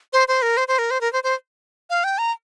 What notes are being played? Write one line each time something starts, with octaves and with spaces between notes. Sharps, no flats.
C5
C5
A#4
C5
C5
A#4
C5
A#4
C5
C5
F5
G5
A#5